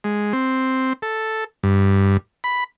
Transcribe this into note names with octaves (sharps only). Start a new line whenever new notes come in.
G#3
C4
A4
G2
B5